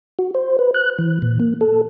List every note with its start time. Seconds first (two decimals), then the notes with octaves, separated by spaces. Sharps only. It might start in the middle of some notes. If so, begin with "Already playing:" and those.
0.19 F#4
0.34 C5
0.59 B4
0.74 F#6
0.99 E3
1.22 A#2
1.40 A#3
1.61 A4